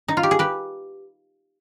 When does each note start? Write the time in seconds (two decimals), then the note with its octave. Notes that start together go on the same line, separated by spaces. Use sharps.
0.08 D#4
0.17 F4
0.23 G4
0.31 G#4
0.39 G4 B4